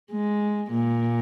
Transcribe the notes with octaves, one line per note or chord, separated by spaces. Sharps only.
G#3
A#2